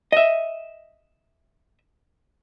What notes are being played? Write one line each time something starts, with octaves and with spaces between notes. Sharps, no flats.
D#5 E5